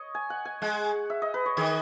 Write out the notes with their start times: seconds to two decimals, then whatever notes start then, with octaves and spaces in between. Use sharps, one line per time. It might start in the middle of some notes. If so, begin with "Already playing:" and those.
Already playing: C#5 D#5
0.15 G#5
0.30 F#5
0.45 G#5
0.62 G#3 F#5
1.10 E5
1.22 D#5
1.34 B4
1.46 C#5
1.57 D#3 G#4